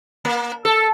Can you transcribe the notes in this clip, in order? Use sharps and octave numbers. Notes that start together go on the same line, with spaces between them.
A#3
A4